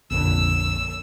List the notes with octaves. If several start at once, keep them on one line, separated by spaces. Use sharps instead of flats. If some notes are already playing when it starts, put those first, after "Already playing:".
A#1 F2 D3 E6